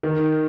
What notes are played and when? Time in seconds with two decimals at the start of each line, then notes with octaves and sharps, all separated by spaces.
0.03 D#3